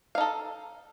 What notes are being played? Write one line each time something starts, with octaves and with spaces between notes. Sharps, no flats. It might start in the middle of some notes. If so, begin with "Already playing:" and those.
D#4 A4 F5